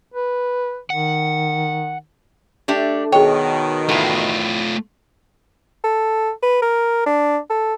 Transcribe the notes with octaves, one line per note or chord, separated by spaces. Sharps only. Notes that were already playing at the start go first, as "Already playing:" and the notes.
B4
D#3 F#5
A3 D4 G4
B2 D#3 G#4 C#5 G5
E2 A2 A3 F4
A4
B4
A#4
D4
A4